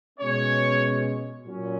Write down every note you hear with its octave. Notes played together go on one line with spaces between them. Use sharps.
B2 G#3 C#4 C#5
A#2 F#3 C#4